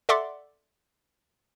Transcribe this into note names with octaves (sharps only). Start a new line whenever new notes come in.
A4 D5 E5 F#5 C6 D6